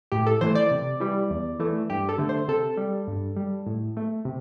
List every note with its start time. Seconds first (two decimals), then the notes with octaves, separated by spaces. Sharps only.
0.12 A2 G4
0.27 A4
0.41 E3 A3 C5
0.55 D5
0.71 C3
1.00 E3 G3
1.30 E2
1.59 E3 A3
1.90 G2 G4
2.09 A4
2.18 D3 A3
2.29 C5
2.48 C3 A4
2.77 G3
3.08 G2
3.36 G3
3.67 A2
3.97 A3
4.25 C3